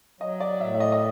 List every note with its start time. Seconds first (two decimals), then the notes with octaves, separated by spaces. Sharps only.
0.21 F#3 D#5
0.40 D5
0.60 A2 E5
0.74 E5
0.80 D#5
0.92 D#5